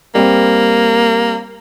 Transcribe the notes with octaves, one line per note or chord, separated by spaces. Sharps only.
G3 A#3 C4